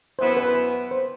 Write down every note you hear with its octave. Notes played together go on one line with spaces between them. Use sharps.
F#2 E3 B3 E4 C5
B4
C5